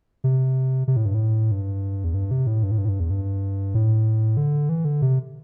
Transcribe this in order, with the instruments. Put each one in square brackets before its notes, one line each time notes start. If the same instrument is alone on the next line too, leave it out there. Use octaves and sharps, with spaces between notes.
[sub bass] C3
C3
A2
G2
A2
G2
E2
G2
C3
A2
G2
A2
G2
A2
G2
E2
G2
A2
D3
E3
D3
C3